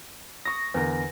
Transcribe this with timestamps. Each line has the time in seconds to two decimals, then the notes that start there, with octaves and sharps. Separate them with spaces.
0.45 C#6 D#6 A#6
0.74 E2 D3 A#4